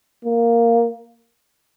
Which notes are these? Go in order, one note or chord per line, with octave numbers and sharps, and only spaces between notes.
A#3